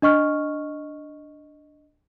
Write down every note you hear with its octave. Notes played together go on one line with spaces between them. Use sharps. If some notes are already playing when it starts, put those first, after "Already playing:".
D4 D#5 C#6 F6